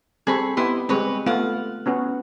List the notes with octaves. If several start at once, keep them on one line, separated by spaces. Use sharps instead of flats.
G3 C4 G#4 A4 B5 C#6
B3 E4 G4 D#5 C6
G3 G#3 C4 B4 C#5 D#5
A3 B3 F4 F5 F#5
B3 C#4 F#4